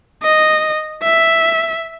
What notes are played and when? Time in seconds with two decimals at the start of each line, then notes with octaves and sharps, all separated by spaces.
0.23 D#5
1.03 E5